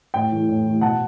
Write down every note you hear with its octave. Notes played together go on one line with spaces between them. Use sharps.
A2 G5
E3 A3
A2
E3 A3
B2 F#5 A5